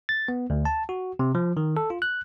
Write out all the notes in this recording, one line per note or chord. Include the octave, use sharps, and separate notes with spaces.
A6
B3
D2
A5
F#4
C3
F3
D#3
A4
F4
F#6